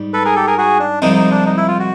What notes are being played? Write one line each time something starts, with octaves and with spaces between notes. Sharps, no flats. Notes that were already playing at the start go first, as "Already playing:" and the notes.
Already playing: G#2 G3
A4 B4
G#4 A#4
G4 A4
G#4 A#4
F#4 G#4
D4
C2 C3 F3 G#3 C4 D#4
D#4
D4
D#4
E4
F4
F#4